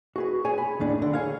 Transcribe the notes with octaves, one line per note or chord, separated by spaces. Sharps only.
F#4 G#4 B4
G#4 C#5 G#5
G#5 B5
D#2 A2 D4 G#4
A2 D3
G#4 C#5 F5